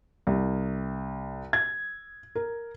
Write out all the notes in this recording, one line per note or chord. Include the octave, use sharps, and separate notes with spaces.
C2
G#6
A#4